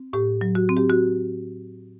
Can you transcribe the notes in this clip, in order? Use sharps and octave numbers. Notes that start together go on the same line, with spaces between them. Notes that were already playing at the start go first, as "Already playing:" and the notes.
Already playing: C4
A2 G4
F#3
F#4
C4
G4
F#4